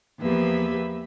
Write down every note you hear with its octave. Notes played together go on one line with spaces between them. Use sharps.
E2 F3 A#3 G4 B4 E5